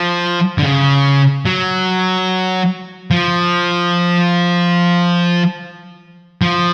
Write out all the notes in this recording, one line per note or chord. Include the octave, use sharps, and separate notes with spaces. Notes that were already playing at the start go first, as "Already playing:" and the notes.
Already playing: F3
D3
C#3
F#3
F3
F3